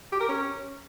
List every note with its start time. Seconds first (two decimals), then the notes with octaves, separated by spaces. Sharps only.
0.12 G4
0.21 A#4
0.29 C#4